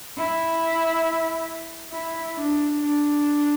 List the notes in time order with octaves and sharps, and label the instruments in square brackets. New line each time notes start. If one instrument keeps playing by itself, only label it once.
[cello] E4
E4
D4
D4